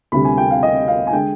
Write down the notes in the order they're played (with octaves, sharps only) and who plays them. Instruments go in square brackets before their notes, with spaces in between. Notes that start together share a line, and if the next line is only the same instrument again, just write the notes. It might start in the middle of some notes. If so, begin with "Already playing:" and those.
[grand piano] D2 C3 G3 B5
G#5
G5
F5
D#5
F5
G#5
D3 G#3 G5